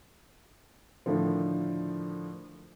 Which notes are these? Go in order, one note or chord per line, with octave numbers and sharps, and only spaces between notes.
A2 D3 D#3 F3